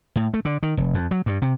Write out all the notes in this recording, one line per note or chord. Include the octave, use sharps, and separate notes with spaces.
A2
A3
D3
D#3
F1
F2
F#3
G2
C3